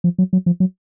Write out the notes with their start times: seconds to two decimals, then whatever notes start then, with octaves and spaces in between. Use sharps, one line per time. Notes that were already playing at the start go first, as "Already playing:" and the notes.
0.04 F3
0.18 F#3
0.33 F#3
0.46 F3
0.60 F#3